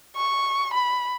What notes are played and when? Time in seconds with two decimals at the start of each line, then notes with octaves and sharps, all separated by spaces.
0.16 C#6
0.74 B5